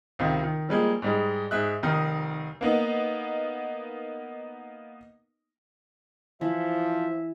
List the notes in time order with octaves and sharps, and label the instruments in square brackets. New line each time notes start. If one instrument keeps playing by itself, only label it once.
[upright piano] C#2 C3 D#3
D#3
F3 G3 G#3 A#3
G#2 G3 G#3
G#2 G#4 E5 F#6
F1 D#3 D#4 F6
[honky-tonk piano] A#3 B3 D#4
[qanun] E3 [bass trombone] F3 [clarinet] E5